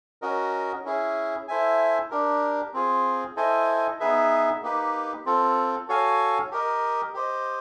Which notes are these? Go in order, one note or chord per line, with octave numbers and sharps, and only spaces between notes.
C#4 F#4 A#4 D#5
C#4 E4 G#4
E4 A4 C5 E5 G#5
D4 G4 A#4
C4 F4 G#4
E4 A4 C5 D#5 G#5
B3 D#4 G#4 B4 E5
A#3 D#4 G4 B4
C4 F4 A4
F#4 A4 C#5 F5 G#5
G4 A#4 D#5
G4 C5 D#5